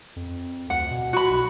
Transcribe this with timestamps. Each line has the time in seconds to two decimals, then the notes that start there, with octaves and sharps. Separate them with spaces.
0.16 F2
0.70 D2 F#5
0.91 B2
1.13 F#4 B5
1.29 B1